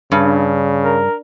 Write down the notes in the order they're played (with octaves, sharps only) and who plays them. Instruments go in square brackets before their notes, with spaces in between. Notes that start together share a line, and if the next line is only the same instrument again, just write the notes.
[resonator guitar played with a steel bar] G2 [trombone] C#3
[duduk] A#4